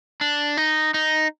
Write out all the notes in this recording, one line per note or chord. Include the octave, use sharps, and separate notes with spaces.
D4
D#4
D#4